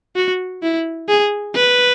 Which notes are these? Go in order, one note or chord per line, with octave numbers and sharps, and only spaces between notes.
F#4
E4
G#4
B4